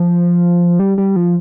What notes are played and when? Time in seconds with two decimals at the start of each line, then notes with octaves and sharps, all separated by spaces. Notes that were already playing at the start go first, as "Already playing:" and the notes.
Already playing: F3
0.79 G3
0.98 G3
1.16 F3